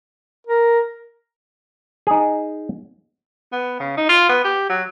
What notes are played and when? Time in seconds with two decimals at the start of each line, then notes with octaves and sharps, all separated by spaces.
0.47 A#4
2.07 D#4 G#4
3.52 B3
3.80 C#3
3.97 D#4
4.09 F4
4.29 B3
4.44 G4
4.69 F#3